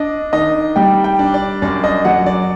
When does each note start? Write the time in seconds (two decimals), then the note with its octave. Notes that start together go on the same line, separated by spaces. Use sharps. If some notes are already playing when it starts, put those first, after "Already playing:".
Already playing: D4 D#5
0.33 D#3 D#5
0.76 G3 G5
1.04 G5
1.19 D4
1.34 D5
1.62 F#2 D5
1.84 D#5
2.05 F#3 F#5
2.26 D5